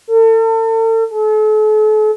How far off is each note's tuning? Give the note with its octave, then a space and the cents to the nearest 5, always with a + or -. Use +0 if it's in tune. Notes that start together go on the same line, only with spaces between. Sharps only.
A4 +40
A4 -40